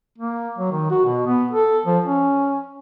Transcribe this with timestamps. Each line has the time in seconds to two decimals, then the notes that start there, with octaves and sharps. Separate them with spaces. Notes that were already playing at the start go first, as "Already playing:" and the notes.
0.18 A#3
0.58 F#3
0.72 D#3
0.91 F#4
1.05 B2
1.26 B3
1.51 A4
1.86 F3
2.06 C#4